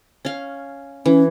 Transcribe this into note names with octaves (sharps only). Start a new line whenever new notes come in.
C#4 F5
E3 C#4